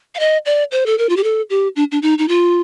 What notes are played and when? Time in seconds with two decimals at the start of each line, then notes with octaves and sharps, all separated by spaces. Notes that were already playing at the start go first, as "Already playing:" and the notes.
0.15 F5
0.19 D#5
0.46 D5
0.72 C5
0.86 A4
0.98 A#4
1.09 F4
1.17 G4
1.24 A4
1.50 G4
1.76 D4
1.92 D4
2.02 D#4
2.19 D#4
2.28 F4